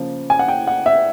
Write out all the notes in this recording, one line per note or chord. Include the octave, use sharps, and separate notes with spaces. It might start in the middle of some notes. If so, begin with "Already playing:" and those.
Already playing: C#3 F3 A#3
G#5
F#5
G5
F#5
E5